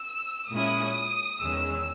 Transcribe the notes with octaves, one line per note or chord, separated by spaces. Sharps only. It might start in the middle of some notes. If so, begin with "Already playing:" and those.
Already playing: E6
A#2 G#3 C#4 E4 D#6
E2 D#3 G#3 C#4 E6